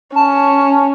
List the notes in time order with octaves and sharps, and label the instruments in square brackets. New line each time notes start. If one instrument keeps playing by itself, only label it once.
[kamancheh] C#4 [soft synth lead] A5